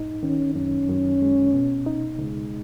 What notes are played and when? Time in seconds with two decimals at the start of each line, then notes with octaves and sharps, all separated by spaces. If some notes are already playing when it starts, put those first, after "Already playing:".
Already playing: G#2 D#4
0.23 D#3 C#4
0.55 F#2 C#4
0.89 F#2
1.22 G#3
1.54 B2
1.86 D#4
2.19 C#2 G#3